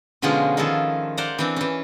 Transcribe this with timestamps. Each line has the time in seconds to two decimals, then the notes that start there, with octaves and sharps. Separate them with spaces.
0.22 B2 D3 F3 G#3 C#4 F4
0.57 D#3 F3 E4 F4 G#4 A4
1.17 C5 D5 F5 F#5 A#5
1.39 E3 C4 D4
1.56 E3 C#4